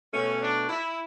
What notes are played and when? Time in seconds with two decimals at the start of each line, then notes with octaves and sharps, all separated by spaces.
0.12 B2 A3 C#4
0.40 D4
0.69 E4